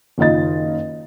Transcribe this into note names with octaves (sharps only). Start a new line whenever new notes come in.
F#1 D#3 F4 D#5 A6